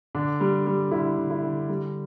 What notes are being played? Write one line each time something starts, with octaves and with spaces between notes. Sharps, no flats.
D3 D4
G3
G3
D3 E4
D3
E4
D3
G3